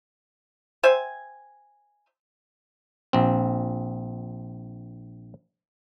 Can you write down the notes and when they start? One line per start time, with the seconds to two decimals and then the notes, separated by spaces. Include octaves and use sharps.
0.83 C5 E5 G5 G#5
3.13 A#1 C4